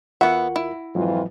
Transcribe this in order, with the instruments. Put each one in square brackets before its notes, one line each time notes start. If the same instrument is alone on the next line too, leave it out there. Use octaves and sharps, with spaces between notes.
[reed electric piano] E2 F4 A#4 [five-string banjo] B3 E5 [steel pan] F#5
[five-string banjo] E4
[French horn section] F2 E3 F4 [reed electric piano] G#2 F#3